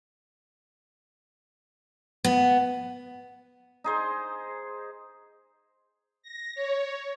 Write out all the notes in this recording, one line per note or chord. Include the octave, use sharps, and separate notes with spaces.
B3
D#4 G#4 C5
A#6
C#5